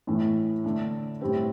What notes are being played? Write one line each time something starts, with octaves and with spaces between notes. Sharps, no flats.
A2 E3 A3
D3 A3 D4
A2 G3 C4 G4